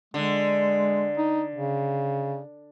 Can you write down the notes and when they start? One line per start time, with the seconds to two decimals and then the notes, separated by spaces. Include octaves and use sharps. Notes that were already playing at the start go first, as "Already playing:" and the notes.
0.14 D3 G#3
1.17 D#4
1.55 C#3